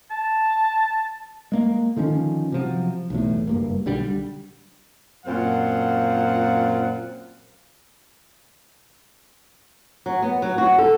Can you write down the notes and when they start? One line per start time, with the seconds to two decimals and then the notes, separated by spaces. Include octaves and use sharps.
0.11 A5
1.52 G#3 A#3
1.96 D3 D#3 F3 C#4
2.52 C3 F3 F#3
3.10 B1 E2 A2
3.47 F#1 G2 A#3
3.86 B1 D3 G3
5.26 F#2 A#2 C4 F5 F#5
10.06 F#3
10.22 B3
10.42 F#3
10.58 F#4
10.78 A4